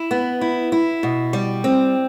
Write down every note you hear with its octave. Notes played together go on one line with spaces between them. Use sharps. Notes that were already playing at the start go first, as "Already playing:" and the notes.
Already playing: E4
B3
E4
E4
B2
G3
C4